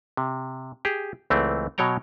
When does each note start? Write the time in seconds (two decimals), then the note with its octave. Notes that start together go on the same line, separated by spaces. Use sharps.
0.17 C3
0.85 G4 G#4
1.30 C#2 E3 A3 C4
1.78 B2 F#3 C#5 G5 A#5